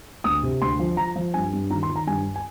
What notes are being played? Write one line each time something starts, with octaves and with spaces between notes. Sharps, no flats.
D2 D#6
C3
D2 C6
F3
F3 A#5
F3
G2 G#5
G2
D#3 A#5
C6
D#3
A#5
G2 G#5
G#5